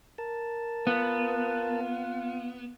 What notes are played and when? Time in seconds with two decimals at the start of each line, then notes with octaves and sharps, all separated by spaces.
0.18 A#4 A5
0.87 B3 F4